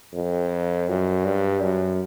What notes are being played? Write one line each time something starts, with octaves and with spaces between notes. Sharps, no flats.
F2
F#2
G2
F#2